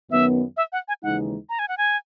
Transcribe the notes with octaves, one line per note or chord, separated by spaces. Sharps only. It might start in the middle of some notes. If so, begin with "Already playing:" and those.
F#2 D#3 F#3 B3 E5
E5
F#5
G#5
D#2 C#3 E3 G#3 D#4 F#5
A#5
G#5
F#5
G#5